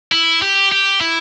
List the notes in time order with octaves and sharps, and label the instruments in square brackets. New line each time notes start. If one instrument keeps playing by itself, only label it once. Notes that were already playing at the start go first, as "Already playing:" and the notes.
[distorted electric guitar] E4
G4
G4
E4